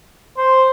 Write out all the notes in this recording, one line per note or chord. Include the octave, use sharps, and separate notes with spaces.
C5